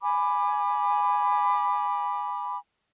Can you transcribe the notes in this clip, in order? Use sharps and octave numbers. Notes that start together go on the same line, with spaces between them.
G#5 B5 D6